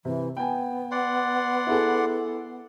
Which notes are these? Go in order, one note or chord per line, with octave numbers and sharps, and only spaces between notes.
C3 E3
B3 G5 G#5
D5 F#5 C6
E4 G#4 A4